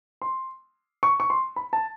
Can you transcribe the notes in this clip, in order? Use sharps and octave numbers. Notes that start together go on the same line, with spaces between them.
C6
C#6
C#6
C6
B5
A5